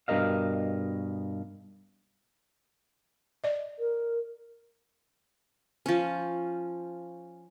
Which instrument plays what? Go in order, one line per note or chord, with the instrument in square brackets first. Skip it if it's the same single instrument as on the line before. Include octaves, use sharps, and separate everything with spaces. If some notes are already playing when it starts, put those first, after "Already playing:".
[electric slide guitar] G2 B2 A#4 D#5 F5
[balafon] D5 D#5
[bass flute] A#4
[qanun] F3 C#4